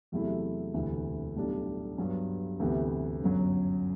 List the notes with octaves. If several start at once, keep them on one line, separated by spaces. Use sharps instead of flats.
E2 C3 F#3 A3 E4
E1 D2 C3 E3
B1 A2 G3 D4
G2 F#3 B3
D2 C3 E3 B3 E4
G1 F#2 F#3